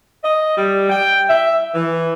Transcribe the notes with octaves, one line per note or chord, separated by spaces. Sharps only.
D#5
G3
G5
E5
E3